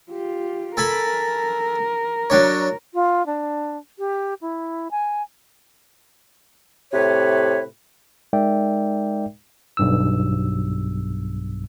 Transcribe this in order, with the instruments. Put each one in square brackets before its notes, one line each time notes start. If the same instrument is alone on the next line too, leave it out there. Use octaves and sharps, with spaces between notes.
[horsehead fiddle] F4 G4
[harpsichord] A4 G#5 B5 [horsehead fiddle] A#4
[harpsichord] F#3 D4 C#5
[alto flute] F4
D4
G4
E4
G#5
[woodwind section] A2 C3 B4 C#5
[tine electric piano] G#3 D#4 A#4 D5 E5 G5
B1 G2 E6